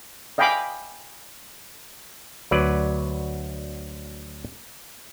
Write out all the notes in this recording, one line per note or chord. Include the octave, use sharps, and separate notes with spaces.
D#5 F5 G5 G#5 B5 D6
D2 F#3 B4 D5